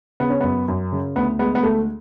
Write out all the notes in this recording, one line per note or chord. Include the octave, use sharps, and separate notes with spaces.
C#3 B3
C#4
F#2 B3
F#2
C#3
D2 B3
G#3 B3
B3
D2 A3